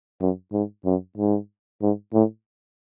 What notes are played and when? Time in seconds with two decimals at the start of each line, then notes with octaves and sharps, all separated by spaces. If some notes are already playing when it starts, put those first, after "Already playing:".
0.21 F#2
0.53 G#2
0.85 F#2
1.17 G#2
1.82 G#2
2.13 A2